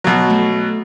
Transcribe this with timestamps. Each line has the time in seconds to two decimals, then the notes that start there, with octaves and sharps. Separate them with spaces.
0.04 B2 F#3
0.30 A3